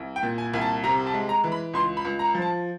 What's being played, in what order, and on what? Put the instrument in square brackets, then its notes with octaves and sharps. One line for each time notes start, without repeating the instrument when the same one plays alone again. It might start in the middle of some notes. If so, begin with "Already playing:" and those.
Already playing: [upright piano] C2
G5
A#2
G#5
C2 G#5
A5
C3 A#5
A5
G#3
A#5
E3
B5
C#2 C6
B5
C#2
A#5
F3
A5